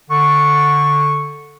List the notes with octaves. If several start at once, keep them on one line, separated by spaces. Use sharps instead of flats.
D3 C#6